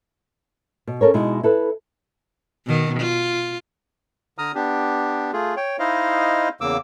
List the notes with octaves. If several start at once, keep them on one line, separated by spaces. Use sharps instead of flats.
B2
C#4 A4 A#4 C#5
B2 G#3 D#4 E4
E4 A4 B4
B2 D#3
F4
D3 A#5 D#6 F6
B3 D4 G4
A3 F4 G#4
C#5 G5
D#4 E4 C5 D#5 F5
E2 C#3 A#3 D6 E6